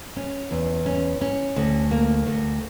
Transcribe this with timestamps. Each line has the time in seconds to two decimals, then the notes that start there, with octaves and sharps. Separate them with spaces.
0.16 C#4
0.51 E2
0.86 C#4
1.21 C#4
1.56 D2
1.91 A#3
2.27 D2